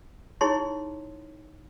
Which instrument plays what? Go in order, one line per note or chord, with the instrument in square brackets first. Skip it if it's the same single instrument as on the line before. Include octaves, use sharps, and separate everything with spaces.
[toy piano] D#4 E4 G#4 C#5 C6